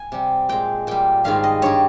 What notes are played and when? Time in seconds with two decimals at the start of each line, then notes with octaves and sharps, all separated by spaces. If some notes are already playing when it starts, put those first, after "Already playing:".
Already playing: G#5
0.12 C3 G3
0.49 A#2 G#3 G5
0.87 A#2 G3 G5
1.24 G#2 D#3 G3 F5
1.44 D#5
1.62 G2 G3 C#5